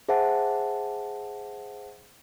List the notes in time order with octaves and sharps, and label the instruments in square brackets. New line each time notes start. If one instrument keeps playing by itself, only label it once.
[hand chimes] G#4 C5 E5 F#5 A5